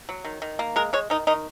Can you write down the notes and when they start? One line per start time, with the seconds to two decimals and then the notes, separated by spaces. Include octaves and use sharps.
0.09 F#3
0.25 D#3
0.42 D#3
0.59 A#3
0.76 G#3 A#4
0.93 G#3 C#5
1.10 D#3 D#4
1.27 D#3 D#4